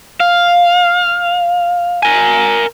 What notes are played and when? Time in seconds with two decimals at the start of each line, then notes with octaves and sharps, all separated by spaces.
0.20 F5
2.03 A#4 G#5